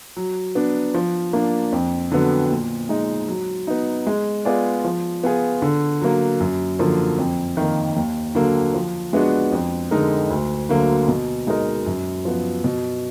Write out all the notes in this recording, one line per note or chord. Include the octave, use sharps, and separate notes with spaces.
F#3
B3 D4
F3
A#3 D4
F2
D3 F#3 B3
A#2
G#3 D#4
F#3
B3 D#4
G#3
B3 F4 G#4 D5
F3
B3 F4 G#4
D3
F#3 A#3
F#2
D3 F3 A#3
F2
D#3 A#3
D#2
D3 F#3 A#3
F3
G#3 B3 D4 F#4
F2
D3 G#3 D#4 A#4
D2
D3 F#3 A#3
B2
G#3 D#4 A#4 D#5
F#2
F3 B3
B2